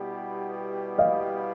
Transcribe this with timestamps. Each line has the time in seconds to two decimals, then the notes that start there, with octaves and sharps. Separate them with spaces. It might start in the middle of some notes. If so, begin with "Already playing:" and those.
Already playing: B2 G3 B3 E4 G4
0.98 D#5 F5